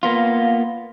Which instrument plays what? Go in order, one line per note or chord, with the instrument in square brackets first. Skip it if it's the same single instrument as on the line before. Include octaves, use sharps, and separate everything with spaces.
[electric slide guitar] A#3 B3 F4